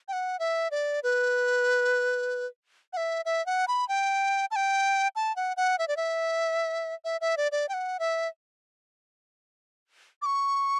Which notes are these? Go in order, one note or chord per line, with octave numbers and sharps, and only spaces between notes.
G5
F#5
E5
D5
B4
F#5
E5
E5
F#5
B5
G5
A5
G5
A5
F#5
F#5
E5
D5
E5
E5
E5
D5
D5
G5
F#5
E5
D6
C#6